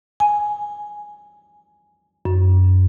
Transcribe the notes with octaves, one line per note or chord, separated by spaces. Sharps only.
G#5
F#2